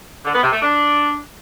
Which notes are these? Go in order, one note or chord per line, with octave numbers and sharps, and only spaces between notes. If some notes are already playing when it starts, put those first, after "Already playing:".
D3
B3
C3
A3
D4